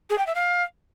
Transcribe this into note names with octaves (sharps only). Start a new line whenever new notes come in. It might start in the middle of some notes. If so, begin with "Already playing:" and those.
G#4
G5
E5
F5